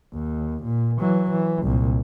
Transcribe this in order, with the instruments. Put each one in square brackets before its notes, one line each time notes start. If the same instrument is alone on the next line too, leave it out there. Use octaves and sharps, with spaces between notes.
[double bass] D#2
A#2
E3 F#3
E3
C2 A#2